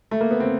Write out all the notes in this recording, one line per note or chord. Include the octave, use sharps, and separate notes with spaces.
A3
A#3
B3
C4